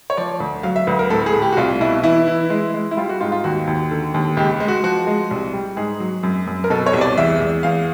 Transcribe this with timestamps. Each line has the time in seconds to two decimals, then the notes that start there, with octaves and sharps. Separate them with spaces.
0.10 C#5
0.17 F3 D5
0.40 D2
0.63 F#3 F5
0.76 E5
0.87 D2 B4
0.99 A#4
1.10 A2 A4
1.26 G#4
1.33 A2
1.42 G4
1.53 F#4
1.57 C2 F4
1.81 B2 E4
2.03 E3 E4
2.28 E3
2.50 G#3
2.74 G#3
2.91 E4
2.97 G3 F4
3.09 F#4
3.21 G#2 F4
3.32 F4
3.44 D#2 F#4
3.67 D#2
3.91 D3
4.14 D#2
4.37 C#2 G4
4.60 G#3
4.68 F#4
4.83 F3 F#4
5.07 G#3
5.31 C2
5.53 G3
5.77 G#2 G#4
6.00 F#3
6.23 F#2
6.47 F#2
6.64 A#4
6.70 B2 A4
6.86 C#5
6.93 C2
7.01 D5
7.17 E2 E5
7.40 E2
7.63 E2 F5